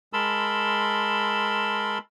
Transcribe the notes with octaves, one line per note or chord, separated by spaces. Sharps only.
G#3 A#4 A5 B5 C6 E6